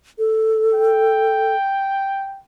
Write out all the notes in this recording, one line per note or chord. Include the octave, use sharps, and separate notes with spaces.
A4
G5